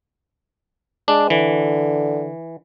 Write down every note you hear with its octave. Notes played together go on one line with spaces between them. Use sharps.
G#3 D4
D3 E3